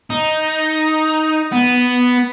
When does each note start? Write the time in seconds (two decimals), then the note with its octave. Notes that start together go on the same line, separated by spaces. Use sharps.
0.10 D#4
1.52 B3